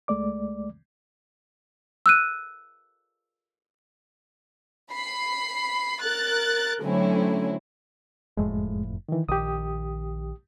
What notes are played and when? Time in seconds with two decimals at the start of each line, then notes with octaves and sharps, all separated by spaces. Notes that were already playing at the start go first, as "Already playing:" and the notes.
0.08 C#2 G#3 A3 D5 D6
2.06 E6 F#6 D#7
4.93 B5 C7
6.02 A#4 F#6 A6
6.81 D3 F#3 A3 C4 C#4 E4
8.37 F#1 F2 A2 G#3
9.09 D#3 E3
9.29 A#1 D#3 G4 D#6